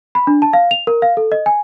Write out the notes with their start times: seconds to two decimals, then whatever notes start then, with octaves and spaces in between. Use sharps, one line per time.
0.15 B5
0.27 D4
0.42 A5
0.53 F5
0.71 F7
0.87 A#4
1.02 F5
1.17 A4
1.32 D#5
1.46 G#5